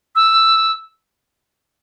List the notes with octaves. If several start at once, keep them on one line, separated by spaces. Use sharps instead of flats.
E6